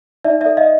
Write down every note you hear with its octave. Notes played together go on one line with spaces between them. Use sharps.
D#4 D5 E5
A4 D5 E5
D#5 F5